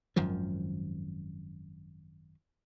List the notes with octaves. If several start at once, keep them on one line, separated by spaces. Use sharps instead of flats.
G#1 F#2 D#3 F3